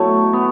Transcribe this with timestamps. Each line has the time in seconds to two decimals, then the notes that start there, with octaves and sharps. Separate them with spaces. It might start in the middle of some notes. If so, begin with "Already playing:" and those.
Already playing: B2 F#3 A3 E4
0.33 B3